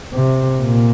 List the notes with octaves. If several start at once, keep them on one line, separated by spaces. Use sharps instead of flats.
C3
A#2